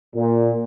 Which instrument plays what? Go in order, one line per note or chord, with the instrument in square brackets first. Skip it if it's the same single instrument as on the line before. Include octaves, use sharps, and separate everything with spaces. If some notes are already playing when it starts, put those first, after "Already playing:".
[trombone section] A#2